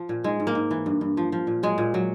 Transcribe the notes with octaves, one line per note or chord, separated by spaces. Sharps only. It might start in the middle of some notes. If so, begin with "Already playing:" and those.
Already playing: F3
A#2
G#2 G#3
G#2
A#3
G#2
E3
G2
G2
F3
F3
A#2
F#3 G#3
A#2
F#3